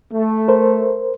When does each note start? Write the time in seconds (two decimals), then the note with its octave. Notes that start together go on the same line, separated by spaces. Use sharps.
0.12 A3
0.48 A#4 C5